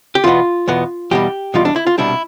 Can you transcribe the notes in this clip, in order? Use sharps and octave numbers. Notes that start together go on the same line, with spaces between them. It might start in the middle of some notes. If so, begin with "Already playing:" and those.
G4
E2 B2 B3 F4
E2 B2 B3
E2 B2 G3 G4
E2 B2 G3 F4
D4
E4
F4
C2 B2 G3 D4 E4